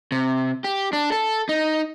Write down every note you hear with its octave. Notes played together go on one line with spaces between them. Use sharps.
C3
G4
D4
A4
D#4